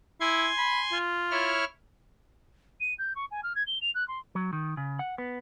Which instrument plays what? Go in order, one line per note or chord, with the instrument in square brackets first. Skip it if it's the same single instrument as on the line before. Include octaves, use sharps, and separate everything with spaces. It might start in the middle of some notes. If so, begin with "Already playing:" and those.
[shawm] E4 [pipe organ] G#5 C6 G#6
[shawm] B5
F4
[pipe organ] E4 C#5 F6
[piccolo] D#7
G6
C#6
G#5
F6
G#6
G7
F7
F#6
C6
[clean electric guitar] F#3
D#3
C#3
F#5
B3